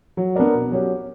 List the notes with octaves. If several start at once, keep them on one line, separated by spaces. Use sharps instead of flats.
F#3
B3 D4 A#4 D5
B2
F#3 C#4 G4